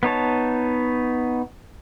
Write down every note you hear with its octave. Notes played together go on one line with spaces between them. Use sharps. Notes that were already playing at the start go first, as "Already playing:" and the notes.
B3 D#4 C#5 A5